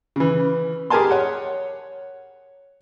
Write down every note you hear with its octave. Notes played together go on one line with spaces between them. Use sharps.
C#3 E3
G4 G#4 A#4 G#5 A5 C6
C#5 F#5